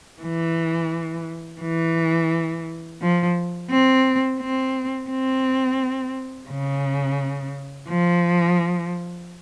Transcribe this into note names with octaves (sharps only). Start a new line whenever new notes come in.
E3
E3
F3
C4
C4
C4
C#3
F3